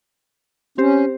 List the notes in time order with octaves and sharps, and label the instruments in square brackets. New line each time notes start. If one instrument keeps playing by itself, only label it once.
[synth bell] C4 G4 C5 [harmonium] C#4